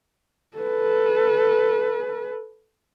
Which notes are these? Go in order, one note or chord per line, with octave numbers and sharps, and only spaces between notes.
A4 B4